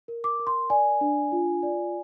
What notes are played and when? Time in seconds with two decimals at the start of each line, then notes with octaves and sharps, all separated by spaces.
0.08 A#4
0.24 D6
0.40 A#4
0.47 C6
0.70 D5 G#5
1.01 D4
1.32 F4
1.63 D5